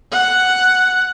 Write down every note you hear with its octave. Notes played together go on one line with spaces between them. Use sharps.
F#5